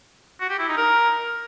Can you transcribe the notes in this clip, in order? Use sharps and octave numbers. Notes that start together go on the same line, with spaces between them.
F#4
G4
E4
D#4
A#4